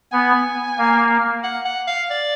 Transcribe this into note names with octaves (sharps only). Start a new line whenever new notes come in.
B3 G#5
A#3
F#5
F#5
F5
D5